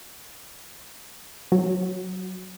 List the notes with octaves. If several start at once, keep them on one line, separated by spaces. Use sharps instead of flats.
F#3